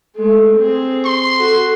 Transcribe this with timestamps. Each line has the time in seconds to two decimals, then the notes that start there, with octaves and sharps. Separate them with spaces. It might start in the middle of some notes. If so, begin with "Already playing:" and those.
0.16 G#3 A3
0.56 C4 G#4
1.05 C6
1.36 F#4 A4